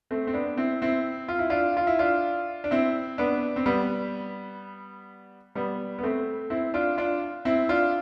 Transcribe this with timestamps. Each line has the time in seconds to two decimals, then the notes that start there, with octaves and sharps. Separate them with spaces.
0.11 A3 C4
0.27 C4
0.34 B3 D4
0.57 C4 E4
0.82 C4 E4
1.28 F4
1.39 E4
1.50 D4 F4
1.77 F4
1.87 E4
1.99 D4 F4
2.64 D4
2.71 C4 E4
3.18 B3 D4
3.56 C4
3.66 G3 B3
5.55 G3 B3
5.98 B3
6.03 A3 C4
6.50 C4 E4
6.74 D4 F4
6.98 D4 F4
7.45 C4 E4
7.69 D4 F4